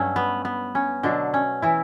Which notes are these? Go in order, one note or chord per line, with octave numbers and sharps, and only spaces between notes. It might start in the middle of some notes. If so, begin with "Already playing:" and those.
Already playing: G2 F#3 A3 C#4
B3
B3
C#4
B2 D3 F#3 A3 D4
C#4
E3 E4